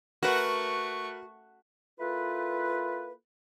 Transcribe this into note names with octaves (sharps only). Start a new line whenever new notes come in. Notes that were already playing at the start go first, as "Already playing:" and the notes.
A3 F#4 A#4 B4 C#6
A#3 E4 F4 A4 B4